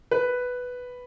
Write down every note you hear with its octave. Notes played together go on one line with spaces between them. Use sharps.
B4